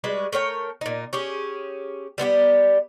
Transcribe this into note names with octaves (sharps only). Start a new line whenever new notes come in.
G3 G#3 F#4 B4
A3 A#4 C#5 G5
A#2 D#4
C#4 G4 G#4
G3 B3 E4 G4